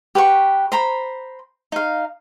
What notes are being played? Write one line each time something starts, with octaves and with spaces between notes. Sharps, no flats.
G4 B4 F#5 C#6
C5 A#5 B5
D#4 F5